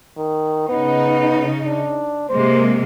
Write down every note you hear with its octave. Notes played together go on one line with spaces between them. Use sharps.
D#3
C#3 B3 D#4
D4
C3 G#3 A#3 C5